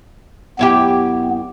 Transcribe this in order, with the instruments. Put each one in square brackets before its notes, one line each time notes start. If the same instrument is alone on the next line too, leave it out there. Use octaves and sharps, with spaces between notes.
[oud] F#2 E4 G4 [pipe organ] B3